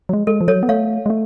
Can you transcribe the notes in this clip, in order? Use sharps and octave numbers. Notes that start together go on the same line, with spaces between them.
F#3
G#3
G#3 A4
F3
F#3 A4 C#5
B3
A3 C#5 F5
G#3
A3